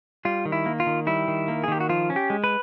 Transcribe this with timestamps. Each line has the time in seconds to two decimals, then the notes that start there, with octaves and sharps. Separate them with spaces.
0.25 G3 F4
0.45 D#3
0.52 E4
0.66 A#3
0.80 F4
0.87 D#3
1.07 G3 E4
1.28 D#3
1.48 A#3
1.64 G#4
1.68 D#3 G4
1.80 F#4
1.89 F3 F4
2.10 C#4
2.16 G4
2.30 G#3
2.44 B4